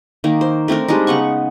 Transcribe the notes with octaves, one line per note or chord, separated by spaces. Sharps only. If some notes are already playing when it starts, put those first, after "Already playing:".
D#3 A#3 D#4
C5
A3 C4 D4 A#4
G3 G#3 D4 D#4
C#3 B3 F#5 C#6